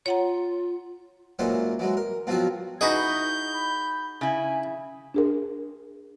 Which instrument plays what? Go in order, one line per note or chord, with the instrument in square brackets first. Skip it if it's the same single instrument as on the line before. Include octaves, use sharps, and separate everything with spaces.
[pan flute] F4 [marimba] C#5 F#5 A#5
[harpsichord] A#2 E3 F#3 G#3 C#4 C5
E3 F#3 G#3
A#4
B2 F3 F#3 C4 F4 F#4
[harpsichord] D#4 F#4 G#4 [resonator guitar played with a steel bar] E4 B4 D#5 [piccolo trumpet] G6
[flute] B5
[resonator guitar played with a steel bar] C#3 E4 [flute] G#5
[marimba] D4 G#4 A#4